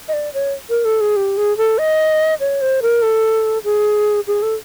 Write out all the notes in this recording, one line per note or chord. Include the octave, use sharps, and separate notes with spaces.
D#5
D5
C#5
A#4
A4
G#4
G4
G#4
A4
D#5
C#5
C5
A#4
A4
G#4
G#4
A4